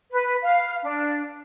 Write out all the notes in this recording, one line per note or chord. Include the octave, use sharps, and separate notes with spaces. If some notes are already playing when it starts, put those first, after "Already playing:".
B4
F5
D4